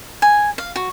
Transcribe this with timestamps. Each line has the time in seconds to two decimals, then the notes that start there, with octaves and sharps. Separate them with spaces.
0.22 G#5
0.58 F5
0.76 F#4